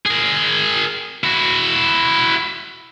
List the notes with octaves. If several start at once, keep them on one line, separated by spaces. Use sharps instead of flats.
G#4 A#4
E4 F#4